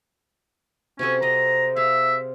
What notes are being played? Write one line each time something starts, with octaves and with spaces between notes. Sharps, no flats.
C3 C#4 F#4 A4
C4 D#5 A#5
G#4 E5 F5